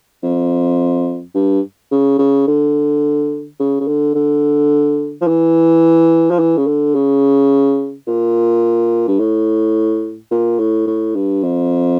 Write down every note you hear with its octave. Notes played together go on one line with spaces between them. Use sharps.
F2
G2
C#3
C#3
D3
C#3
C#3
D3
D3
F3
E3
F3
E3
C#3
D3
C#3
A#2
G2
A2
A#2
A2
A2
G2
F2